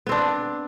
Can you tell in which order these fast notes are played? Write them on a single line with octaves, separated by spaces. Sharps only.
B3 C4 D4